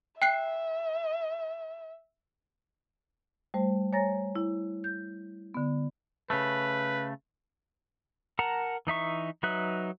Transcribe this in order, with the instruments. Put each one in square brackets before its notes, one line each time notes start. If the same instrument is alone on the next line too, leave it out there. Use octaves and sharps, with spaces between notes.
[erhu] E5 [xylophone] G5 F#6 C7
[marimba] G3 A3 C5
C#5 G#5 A#5 A6 A#6
E4
G6
D3 B3
[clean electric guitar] C#3 A3 [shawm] B4
[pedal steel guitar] A#4 F#5 A5 A#5
E3 D#4 E5 C#6
F#3 D#4 B4 E5 F#6